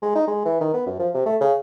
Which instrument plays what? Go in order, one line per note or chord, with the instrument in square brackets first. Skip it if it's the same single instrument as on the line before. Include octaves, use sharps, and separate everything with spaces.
[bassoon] G#3
D#4
G#3
E3
D#3
B3
F#2
F3
C3
A3
C#3